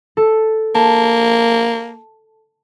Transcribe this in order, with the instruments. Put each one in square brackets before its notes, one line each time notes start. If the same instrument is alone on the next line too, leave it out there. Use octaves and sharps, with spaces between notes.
[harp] A4
[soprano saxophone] A#3 [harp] A5